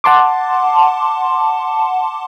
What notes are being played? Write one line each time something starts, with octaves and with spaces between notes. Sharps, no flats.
F#5 A5 C6 D6